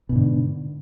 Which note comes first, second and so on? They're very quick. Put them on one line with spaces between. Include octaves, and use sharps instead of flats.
B2 G#2 D3